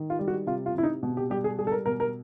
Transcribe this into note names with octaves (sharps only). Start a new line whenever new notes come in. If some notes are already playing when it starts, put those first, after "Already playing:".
Already playing: D#3
F4
G3
F#4
C3 F4
F4
C3 E4
D#4
B2
G4
G3 G4
G#4
G3 G#4
A4
A#4
B2 A#4
A#4